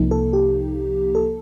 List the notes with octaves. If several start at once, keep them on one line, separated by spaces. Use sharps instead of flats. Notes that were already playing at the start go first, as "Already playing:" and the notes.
Already playing: C2 C3 F3 A#3 D#4
A4
G4
A4